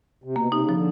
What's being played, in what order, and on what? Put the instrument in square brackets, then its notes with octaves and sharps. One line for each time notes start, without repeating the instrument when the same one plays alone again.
[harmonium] C3
[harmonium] B2 [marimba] A#3
[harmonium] C3 [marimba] D#4
[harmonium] C#3
[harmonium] D3 [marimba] F3